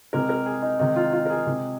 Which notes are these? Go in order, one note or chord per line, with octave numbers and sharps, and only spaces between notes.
C3 G#3 A#4
A#4
G#4
D#4
C3 D#3 G#3 D#4
F4
F4
A#4
G#4
C3 G#3